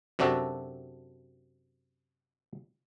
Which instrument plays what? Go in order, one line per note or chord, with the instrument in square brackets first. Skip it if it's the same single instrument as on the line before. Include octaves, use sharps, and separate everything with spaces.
[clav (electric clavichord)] F#2 C3 D4 F#4 A4